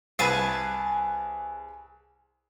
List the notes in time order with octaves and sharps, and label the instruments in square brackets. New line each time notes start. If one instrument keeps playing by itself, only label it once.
[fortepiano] C2 B4 [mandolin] G#4 G#5 A5